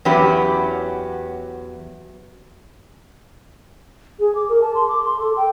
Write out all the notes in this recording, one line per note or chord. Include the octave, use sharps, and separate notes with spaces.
E2 F#3 C#4 G4 B4
G#4
D6
A#4
A5
C6
D6
C6
A4
G5